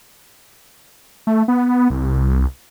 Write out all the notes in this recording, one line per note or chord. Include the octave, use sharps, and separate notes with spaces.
A3
B3
C2